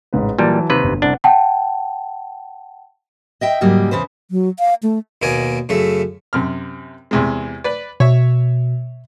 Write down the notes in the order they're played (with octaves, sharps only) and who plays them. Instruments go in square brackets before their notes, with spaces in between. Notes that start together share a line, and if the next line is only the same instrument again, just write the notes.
[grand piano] A1 G#2 B4
[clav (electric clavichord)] A#2 G3 [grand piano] E3 F#3 A5
[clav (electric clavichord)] D#2 C3 B4
[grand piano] G1
[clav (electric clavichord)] C2 D4 [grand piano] F#5
[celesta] F#5 G5 A5
[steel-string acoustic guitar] D#5 E5 G5
G#2 C#3 F#3 G3 A#3
E2 A#2 C#3 B4 C5
[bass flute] F#3
F5
A3
[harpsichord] D#2 B2 A#3 D5 D#5 G#5
F#2 C#3 A3 E5
[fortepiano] F#2 C3 F6
E2 C3 G#3
B4 D5
[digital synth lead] B2 [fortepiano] C#5 E5